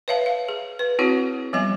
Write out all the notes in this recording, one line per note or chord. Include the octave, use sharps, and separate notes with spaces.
B4 C#5 E5 F5 A5
F5
G#4
B4
C4 E4 F#4 G#4 C#5 F#5
F3 G3 B3 D#5 G#5